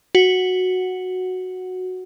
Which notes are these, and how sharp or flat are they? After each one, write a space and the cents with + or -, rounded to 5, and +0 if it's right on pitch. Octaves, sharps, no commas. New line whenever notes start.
F#4 -5 F#5 +0